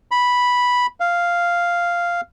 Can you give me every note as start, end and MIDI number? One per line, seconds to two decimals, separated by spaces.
0.11 0.86 83
1.00 2.21 77